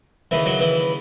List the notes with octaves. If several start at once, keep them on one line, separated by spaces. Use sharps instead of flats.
D#2 C#3 E3 E4
F#3 F#4
E3 E4